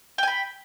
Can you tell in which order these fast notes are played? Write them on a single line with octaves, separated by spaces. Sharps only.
G5 G#5 B5